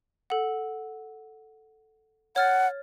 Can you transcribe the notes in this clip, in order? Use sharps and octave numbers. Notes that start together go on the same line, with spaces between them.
A4 F#5
C#5 F#5 F6 A6